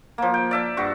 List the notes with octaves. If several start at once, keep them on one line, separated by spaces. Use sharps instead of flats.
F3 A#3
G5
D5 E5 A5
G2 F#4 C#6